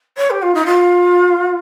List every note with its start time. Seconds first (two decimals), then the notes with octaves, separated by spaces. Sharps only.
0.17 C#5
0.30 G4
0.42 F4
0.55 D#4
0.66 F4